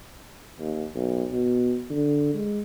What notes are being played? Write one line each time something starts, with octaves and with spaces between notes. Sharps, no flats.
D#2
B1
B2
D3
G#3